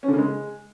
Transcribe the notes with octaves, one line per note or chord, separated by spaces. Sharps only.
C#4
D3
C#3
G#3